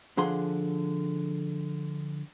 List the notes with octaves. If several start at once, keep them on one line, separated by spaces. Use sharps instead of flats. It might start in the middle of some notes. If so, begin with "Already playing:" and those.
D3 F3 G#4 F#5 C6